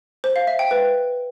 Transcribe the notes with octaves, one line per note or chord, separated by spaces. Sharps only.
C5
F5
E5
G5
B4